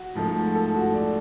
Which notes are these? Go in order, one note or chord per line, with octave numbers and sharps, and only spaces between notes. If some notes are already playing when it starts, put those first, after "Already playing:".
Already playing: F#4
G#2 F3 A3
A4
F#4
D5